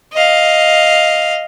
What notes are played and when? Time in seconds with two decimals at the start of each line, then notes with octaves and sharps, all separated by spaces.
0.13 D#5 F5